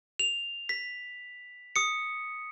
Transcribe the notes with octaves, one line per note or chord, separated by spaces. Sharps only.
F7
B6
D#6 C#7